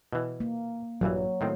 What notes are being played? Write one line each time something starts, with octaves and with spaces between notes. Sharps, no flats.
B2 E3
A#3
A#1 G2 E3 F#3
A2 D#3 C4